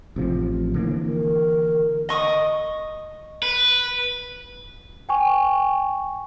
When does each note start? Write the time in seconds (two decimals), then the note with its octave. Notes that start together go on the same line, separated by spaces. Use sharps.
0.16 A1 C3 F3
0.74 D3 E3 A#3
1.07 A#4
2.09 D#5 C#6 D#6
3.43 B4
5.09 G5 G#5 C#6